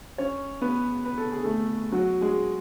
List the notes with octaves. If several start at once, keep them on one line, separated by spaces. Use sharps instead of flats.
C#4 C#5
B3 B4
B4
A4
G#4
A3 A4
F#3 F#4
G#3 G#4